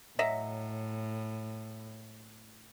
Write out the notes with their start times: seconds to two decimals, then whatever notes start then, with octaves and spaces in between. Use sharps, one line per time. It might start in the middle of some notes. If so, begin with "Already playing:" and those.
0.19 A2 F#3 D#5 E5